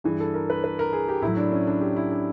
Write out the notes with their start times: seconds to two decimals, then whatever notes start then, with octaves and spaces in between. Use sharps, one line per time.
0.04 G2 E3 G#4
0.20 A4
0.34 A#4
0.50 B4
0.64 B4
0.79 A#4
0.93 G#4
1.09 G4
1.22 A2 F#3 E4
1.37 D4
1.52 C#4
1.67 D4
1.81 G4
1.97 E4
2.12 D4